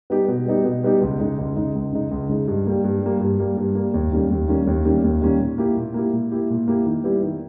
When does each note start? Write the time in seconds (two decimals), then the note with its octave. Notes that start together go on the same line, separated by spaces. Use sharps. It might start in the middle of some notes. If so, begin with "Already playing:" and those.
0.10 G3 B3 D#4 G4
0.28 B2
0.46 G3 B3 D#4 G4
0.64 B2
0.83 G3 B3 D#4 G4
1.01 C#2
1.19 C#3 G#3 D#4
1.38 C#2
1.56 C#3 G#3 D#4
1.75 C#2
1.93 C#3 G#3 D#4
2.11 C#2
2.29 C#3 G#3 D#4
2.48 G2
2.66 G3 A#3
2.84 G2
3.02 G3 A#3
3.20 G2
3.39 G3 A#3
3.57 G2
3.75 G3 A#3
3.94 D#2
4.12 D#3 G3 A#3 C#4
4.31 D#2
4.48 D#3 G3 A#3 C#4
4.67 D#2
4.85 D#3 G3 A#3 C#4
5.04 D#2
5.22 D#3 G3 A#3 C#4
5.40 A#2
5.58 A#3 E4 G4
5.77 A#2
5.94 A#3 E4 G4
6.13 A#2
6.31 A#3 E4 G4
6.50 A#2
6.68 A#3 E4 G4
6.86 D#3
7.04 G3 B3 E4 G4
7.23 D#3